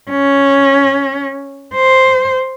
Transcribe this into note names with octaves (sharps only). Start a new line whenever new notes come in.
C#4
C5